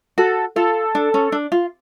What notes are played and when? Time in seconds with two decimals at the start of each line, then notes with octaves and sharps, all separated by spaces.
0.18 F#4 A4
0.56 F4 A4
0.95 D4
1.14 C#4
1.32 D4
1.52 F4